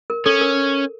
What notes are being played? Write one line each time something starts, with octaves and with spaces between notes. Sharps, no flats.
A#4
C#4 A4
A#4